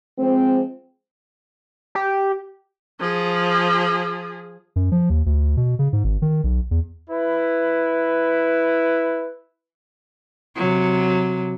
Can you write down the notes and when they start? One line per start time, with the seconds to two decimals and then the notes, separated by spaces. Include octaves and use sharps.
0.18 F3 G#3 C4
1.95 G4
3.00 F3 G#4
4.76 F#2
4.92 F3
5.10 D#2
5.26 D2
5.57 B2
5.79 C#3
5.93 G#2
6.04 G#1
6.22 D#3
6.44 B1
6.71 E2
7.10 E4 B4
10.56 C3 F#3